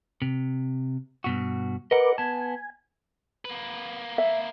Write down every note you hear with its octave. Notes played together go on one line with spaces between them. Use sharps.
C3
G2 B2 F#4
A#4 B4 D#5 F#5 D6
B3 G#5 A5
A#3 B4
E5